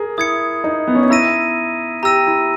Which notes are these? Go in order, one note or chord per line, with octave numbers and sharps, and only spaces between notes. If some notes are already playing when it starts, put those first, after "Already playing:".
Already playing: G#4 A#4
E4 D#6 G#6 C#7
D#4
B3
C#4
D#4
E4 A#5 E6 A#6 D#7
G4 A#5 E6 A#6 D#7
E4